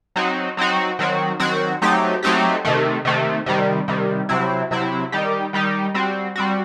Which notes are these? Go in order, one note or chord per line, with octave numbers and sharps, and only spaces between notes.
F#3 C4 D#4 F#4
F#3 C4 D#4 F#4
D#3 F#3 C4 F#4
D#3 F#3 C4 F#4
F#3 A3 C4 D#4 G4
F#3 A3 C4 D#4 G4
C3 D#3 A3
C3 D#3 A3
C3 D#3 G3
C3 D#3 G3
C3 F#3 C4 E4
C3 F#3 C4 E4
D#3 G3 D#4 G4
D#3 G3 D#4 G4
G3 C4 F#4
G3 C4 F#4